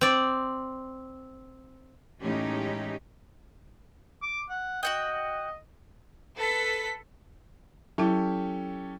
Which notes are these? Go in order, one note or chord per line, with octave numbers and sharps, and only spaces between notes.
C4 D5
A2 E3 G#3 C#4 D#4 G4
D6
F#5
F#4 D#5 F#5 G5
A4 B4 B6
F#3 C#4 E4 G4 A4